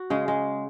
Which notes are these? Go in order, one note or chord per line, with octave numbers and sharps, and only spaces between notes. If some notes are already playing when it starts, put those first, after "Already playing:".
Already playing: F#4
C#3 G#3 G#4
G#3